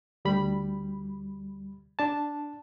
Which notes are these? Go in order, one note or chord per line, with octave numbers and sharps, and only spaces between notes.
D2 G3 B5
D4 A5